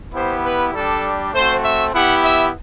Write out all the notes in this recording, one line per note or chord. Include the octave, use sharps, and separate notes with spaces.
B3 E4 G4 C5
B4
G3 D4 G4 A4
A3 C4 F#4 C5
E5
B3 E4 G4 F#5
E5